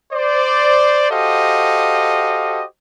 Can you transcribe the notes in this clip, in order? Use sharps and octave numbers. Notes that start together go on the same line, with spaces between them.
C5 D5
F#4 G4 A4 C5 D#5 F5